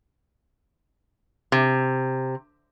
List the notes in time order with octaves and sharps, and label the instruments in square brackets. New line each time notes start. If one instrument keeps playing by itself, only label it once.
[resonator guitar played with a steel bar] C3